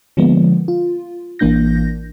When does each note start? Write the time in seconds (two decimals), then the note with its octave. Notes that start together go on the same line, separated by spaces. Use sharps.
0.17 D3 F3 G#3 A#3 B3
0.68 F4
1.39 A1 E3 A#3 D4 G6 A#6